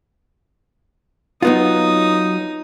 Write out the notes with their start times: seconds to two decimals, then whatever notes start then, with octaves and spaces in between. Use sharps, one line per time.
1.42 F#3 B3 D#4 F4 D#6